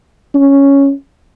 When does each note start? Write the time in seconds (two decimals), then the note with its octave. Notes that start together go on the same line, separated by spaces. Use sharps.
0.35 C#4